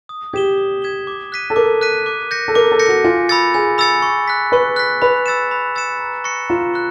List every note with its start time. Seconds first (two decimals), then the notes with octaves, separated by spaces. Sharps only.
0.09 D#6
0.33 G4 G#6 B6 E7 G7
0.57 D#6
0.82 G#6 B6 E7 G7
1.07 D6
1.32 F#6 B6 D#7
1.50 A4
1.56 A#4 D6
1.81 F#6 B6 D#7
2.06 D6
2.31 G6 A#6 C#7
2.48 A4
2.55 A#4 D6
2.72 A4
2.79 G6 A#6 C#7
2.88 F#4
3.04 F4 G#5
3.29 B5 E6 A6 C#7
3.54 G#4 G#5
3.78 B5 E6 A6 C#7
4.02 C#6
4.28 F#6 B6
4.52 B4 C#6
4.76 F#6 B6
5.02 B4 B5
5.26 E6 A6 C#7 E7
5.51 B5
5.75 E6 A6 C#7 E7
6.00 A#5
6.24 C#6 F#6 A#6 C#7
6.49 F4 A#5
6.74 C#6 F#6